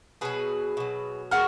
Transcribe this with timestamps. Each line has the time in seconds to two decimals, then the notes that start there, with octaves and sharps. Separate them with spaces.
0.21 B2 F#3 G#4 B4
0.77 B2 F#3
1.31 E3 G#3 F#4 A#4